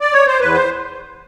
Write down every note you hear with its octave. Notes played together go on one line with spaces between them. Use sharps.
D5
C#5
C5
E2 B4
C5